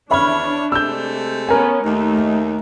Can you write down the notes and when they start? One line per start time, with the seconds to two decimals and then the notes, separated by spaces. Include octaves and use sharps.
0.11 E2 D4 C#5 E5 B5 F6
0.72 C3 G#3 A3 E6 G6
1.49 B3 C#4 A#4 G#5
1.85 D#2 A3 D#4